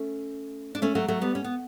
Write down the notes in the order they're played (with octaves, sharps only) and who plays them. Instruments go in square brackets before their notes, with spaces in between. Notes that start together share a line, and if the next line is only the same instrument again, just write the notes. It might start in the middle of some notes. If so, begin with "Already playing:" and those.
Already playing: [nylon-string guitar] A3 C#4
D4
A3 C#4
F#3 A3
F#3 A3
G3 B3
C#4
B3